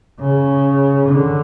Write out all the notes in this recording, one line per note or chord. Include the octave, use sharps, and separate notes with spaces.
C#3
D3